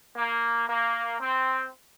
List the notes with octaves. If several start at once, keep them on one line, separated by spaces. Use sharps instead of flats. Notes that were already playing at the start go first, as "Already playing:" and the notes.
A#3
A#3
C4